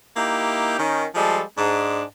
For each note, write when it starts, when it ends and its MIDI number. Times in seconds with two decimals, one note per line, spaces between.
0.17 0.78 58
0.17 0.78 63
0.17 0.78 64
0.17 0.78 67
0.79 1.05 51
0.79 1.05 61
1.15 1.41 53
1.15 1.41 55
1.15 1.41 56
1.15 1.41 69
1.58 2.03 44
1.58 2.03 62